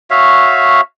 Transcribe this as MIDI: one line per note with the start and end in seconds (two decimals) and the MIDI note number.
0.10 0.81 66
0.10 0.81 73
0.10 0.81 76
0.10 0.81 77